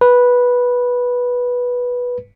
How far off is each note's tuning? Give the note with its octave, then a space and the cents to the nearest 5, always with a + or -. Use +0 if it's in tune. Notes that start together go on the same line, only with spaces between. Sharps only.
B4 -10